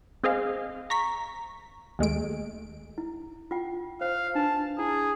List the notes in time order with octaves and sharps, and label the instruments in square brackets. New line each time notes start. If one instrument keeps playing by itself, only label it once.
[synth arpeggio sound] C4 G#4 D#5 F5
A#5 C#6 B6
D#2 G#3 A3 D7
[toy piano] E4
F4 G5
[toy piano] C5 [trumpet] F5
[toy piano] D4 B4 [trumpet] A5
[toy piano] E4 [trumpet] G#4